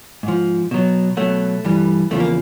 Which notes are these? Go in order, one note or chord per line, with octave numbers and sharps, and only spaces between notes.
G#2 F3
B2 F#3
B2 F#3 A3
G2 E3 G3
E2 C#3 F3 A3
A#3